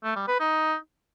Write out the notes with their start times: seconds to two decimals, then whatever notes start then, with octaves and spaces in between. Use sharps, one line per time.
0.04 A3
0.16 G3
0.28 B4
0.40 D#4